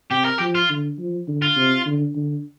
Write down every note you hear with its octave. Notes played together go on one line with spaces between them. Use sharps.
C3 G4
A#4
F3 G4
F4
D3
F3
D3
F4
C3
D3
D3